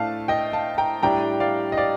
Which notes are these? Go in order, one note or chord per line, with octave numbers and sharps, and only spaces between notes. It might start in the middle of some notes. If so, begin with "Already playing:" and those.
Already playing: A2 A3 D4 F5 A5
D#5 G5
F5 A5
G5 A#5
A2 G3 D4 G5 A#5
D5 F5
D#5
D5 F5